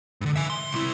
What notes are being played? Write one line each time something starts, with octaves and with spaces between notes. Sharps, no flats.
G2 D3
E5 G#5
C6
C2 E4